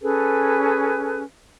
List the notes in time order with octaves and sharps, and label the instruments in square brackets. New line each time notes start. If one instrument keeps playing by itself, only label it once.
[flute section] C#4 G#4 A4 B4